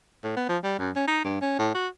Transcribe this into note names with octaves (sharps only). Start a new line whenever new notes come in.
A2
B3
F3
G3
F#2
C#4
D#4
G2
C#4
A2
F#4